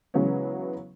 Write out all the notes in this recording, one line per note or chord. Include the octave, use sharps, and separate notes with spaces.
C#3 E3 F#3 G#3 B3 C#4